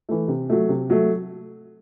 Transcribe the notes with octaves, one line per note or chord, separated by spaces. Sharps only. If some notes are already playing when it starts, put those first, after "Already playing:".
E3 A3
C3
F#3 A3
C3
F#3 A3